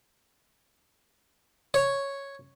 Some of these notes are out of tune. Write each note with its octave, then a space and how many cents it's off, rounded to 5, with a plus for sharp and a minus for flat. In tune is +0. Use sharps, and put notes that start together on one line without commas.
C#5 +0